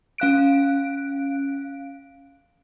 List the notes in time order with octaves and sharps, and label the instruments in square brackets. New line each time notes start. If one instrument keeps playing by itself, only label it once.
[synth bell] C#4 F5 F#6 D7